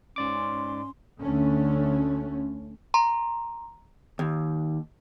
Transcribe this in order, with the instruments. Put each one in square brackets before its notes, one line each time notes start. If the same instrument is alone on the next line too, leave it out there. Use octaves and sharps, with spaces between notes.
[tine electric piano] G#2 D5 D6 [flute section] C#4 C6
[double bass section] D2 D3 A3 C#4
[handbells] A#5 C6
[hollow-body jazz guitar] D#2